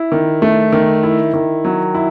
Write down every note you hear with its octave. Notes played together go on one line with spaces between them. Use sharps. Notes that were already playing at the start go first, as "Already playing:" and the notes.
Already playing: E4
D#3
A3
D#3
E4
D#3
F#3
E4